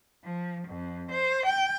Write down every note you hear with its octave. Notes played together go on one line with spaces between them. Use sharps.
F3
F2
C5
G5